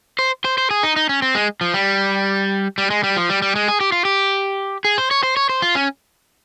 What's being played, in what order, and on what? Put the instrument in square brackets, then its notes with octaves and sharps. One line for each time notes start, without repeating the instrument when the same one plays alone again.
[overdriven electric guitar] C5
C5
C5
G#4
D#4
D#4
C#4
C4
G#3
F3
G3
G3
G#3
G3
F3
G3
G3
G#3
G#4
G4
F4
G4
G#4
C5
C#5
C5
C#5
C5
F4
C#4